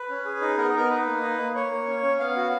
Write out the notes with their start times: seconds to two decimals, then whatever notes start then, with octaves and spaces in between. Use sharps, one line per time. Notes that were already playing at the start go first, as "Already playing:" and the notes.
Already playing: B4
0.09 C#4
0.25 G#4
0.41 D#4
0.57 B3 A#4
0.74 B3 A#4
0.90 D#4 B4
1.06 A#3
1.23 D#4
1.38 A#3
1.55 A#3 C#5
1.71 A#3
1.87 C#4
2.03 C#4
2.20 B3 F5
2.36 F#4